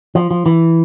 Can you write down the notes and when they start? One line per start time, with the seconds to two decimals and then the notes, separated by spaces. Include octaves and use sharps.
0.15 F3
0.31 F3
0.46 E3